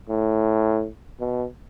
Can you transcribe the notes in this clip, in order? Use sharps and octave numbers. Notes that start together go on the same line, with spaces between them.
A2
B2